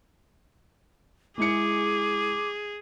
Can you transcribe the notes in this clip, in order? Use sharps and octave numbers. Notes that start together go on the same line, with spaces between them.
G#3 E4 G#4 D6 C#7